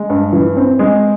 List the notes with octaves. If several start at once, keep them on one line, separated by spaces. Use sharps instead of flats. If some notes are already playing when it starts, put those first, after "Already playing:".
Already playing: G#3
G2
E3
C4
G#3